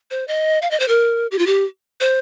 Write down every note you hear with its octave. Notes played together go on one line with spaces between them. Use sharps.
C5
D#5
F5
D#5
C5
A#4
G4
F4
G4
C5